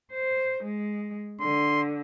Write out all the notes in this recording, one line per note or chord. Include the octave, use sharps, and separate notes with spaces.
C5
G#3
D3 C6